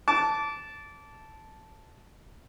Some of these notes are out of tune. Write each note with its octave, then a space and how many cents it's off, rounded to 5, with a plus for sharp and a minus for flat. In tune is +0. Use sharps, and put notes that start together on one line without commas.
A5 -5 D6 -25